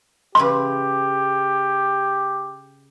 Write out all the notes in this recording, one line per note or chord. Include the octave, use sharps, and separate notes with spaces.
C#3 G4 B4 E5 C6